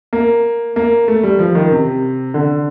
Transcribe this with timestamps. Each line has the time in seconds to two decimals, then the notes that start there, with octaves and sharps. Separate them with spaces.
0.13 A#3
0.76 A#3
1.08 A3
1.23 G3
1.39 F3
1.55 D#3
1.71 C3
2.34 D3